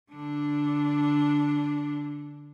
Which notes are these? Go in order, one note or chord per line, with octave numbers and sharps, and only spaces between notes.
D3 D4